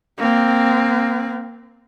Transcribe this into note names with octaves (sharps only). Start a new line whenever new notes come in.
A#3 C4